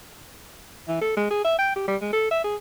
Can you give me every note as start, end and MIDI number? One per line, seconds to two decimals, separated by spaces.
0.88 1.00 52
1.02 1.16 69
1.17 1.28 56
1.31 1.45 68
1.45 1.57 76
1.59 1.71 79
1.76 1.87 67
1.88 1.96 55
2.01 2.11 56
2.13 2.31 69
2.31 2.43 76
2.44 2.56 68